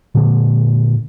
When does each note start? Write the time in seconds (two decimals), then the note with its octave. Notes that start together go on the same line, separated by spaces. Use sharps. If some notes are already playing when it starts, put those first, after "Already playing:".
0.15 A#2 D3 G#3